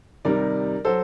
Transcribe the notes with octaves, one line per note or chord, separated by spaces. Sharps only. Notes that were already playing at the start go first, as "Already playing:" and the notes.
C3 D#3 G3 A#4 D5
F#3 A4 C5